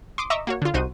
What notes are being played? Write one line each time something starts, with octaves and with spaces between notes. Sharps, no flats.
C6 D6 D#6
D#5 E5 A#5 C#6 D6 E6
A#3 F#4 C#5
D3 F4
C2 D#4 F#4 C5 D#7